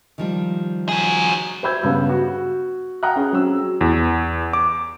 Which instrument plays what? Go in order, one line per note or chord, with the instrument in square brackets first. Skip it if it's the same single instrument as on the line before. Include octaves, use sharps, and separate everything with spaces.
[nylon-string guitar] D#3 F3 G3
[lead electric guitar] F#3 G#4
[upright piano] C5 E5 B5 E6 G6 G#6
G2 C#3 B3
F#4
F#5 G5 A#5 D#6 F6 F#6
C#4 G#4
F#3 C4 C#4 E6
[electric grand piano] E2
D6